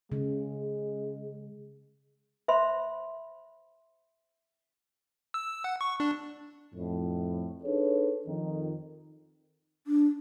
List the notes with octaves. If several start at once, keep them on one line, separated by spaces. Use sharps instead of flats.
C#3 G#3
C5 E5 B5 C6
E6
F#5
C#6
D4
F2 A2
D4 D#4 G#4 A4 B4 C#5
F2 D#3
D4